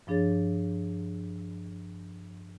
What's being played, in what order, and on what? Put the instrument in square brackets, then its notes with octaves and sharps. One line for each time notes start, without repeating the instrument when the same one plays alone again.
[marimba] G2 F3 D4 G#4 C#5 A6